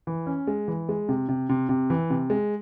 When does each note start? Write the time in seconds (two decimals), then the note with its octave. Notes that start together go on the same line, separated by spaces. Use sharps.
0.07 E3
0.27 C#4
0.47 G#3
0.68 E3
0.89 G#3
1.09 C3
1.29 C3
1.49 C3
1.69 C3
1.90 E3
2.10 C3
2.30 G#3